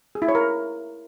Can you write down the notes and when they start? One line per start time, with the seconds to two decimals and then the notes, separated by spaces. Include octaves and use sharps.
0.15 G#4
0.22 E4
0.28 C#5
0.35 A#4